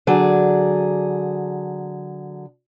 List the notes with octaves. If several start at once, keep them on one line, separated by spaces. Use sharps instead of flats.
D3 F#3 G#4 D5